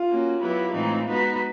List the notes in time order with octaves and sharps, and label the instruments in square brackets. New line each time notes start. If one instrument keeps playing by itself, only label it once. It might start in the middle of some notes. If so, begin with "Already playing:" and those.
Already playing: [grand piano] F4
[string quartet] A#3 C#4 F#4
F#3 B3 E4 G4 B4
A2 E3 G#3 C4 D#4
G#3 B3 D#4 F#4 B4